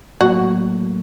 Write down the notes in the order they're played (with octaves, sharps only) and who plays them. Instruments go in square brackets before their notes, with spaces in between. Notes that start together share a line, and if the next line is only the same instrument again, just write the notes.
[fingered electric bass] A2 F#3 A#3 [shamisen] F#4